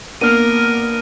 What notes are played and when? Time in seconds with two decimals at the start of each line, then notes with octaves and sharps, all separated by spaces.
0.21 A#3 B3 D4 A#4 F6 D#7
0.65 F6